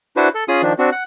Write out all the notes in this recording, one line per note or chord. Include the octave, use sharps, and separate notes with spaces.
D4 E4 F#4 B4 C5
A4
C#4 F4 G#4 D#6
D#3 F3 D4
C4 D4 F#4
F#5